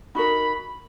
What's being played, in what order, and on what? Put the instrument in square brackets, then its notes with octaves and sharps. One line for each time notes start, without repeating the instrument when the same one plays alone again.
[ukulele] D#4 F#4 A#4 [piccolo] B5